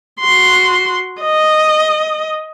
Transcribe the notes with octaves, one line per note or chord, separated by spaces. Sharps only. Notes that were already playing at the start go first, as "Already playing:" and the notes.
F#4 C6
D#5